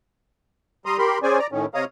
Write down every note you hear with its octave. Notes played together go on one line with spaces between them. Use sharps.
G3 A#5 C6 D#6
G4 A#4 B5 C6
C#4 G#4 C5 D5 G#5
D5 A#5
A2 D#3 C#4
C3 C#5 D#5 F5 A#5 D#6